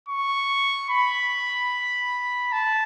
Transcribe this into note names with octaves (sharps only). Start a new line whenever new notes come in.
C#6
B5
A5